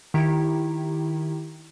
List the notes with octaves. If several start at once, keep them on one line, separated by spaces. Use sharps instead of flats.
D#3 E4 G4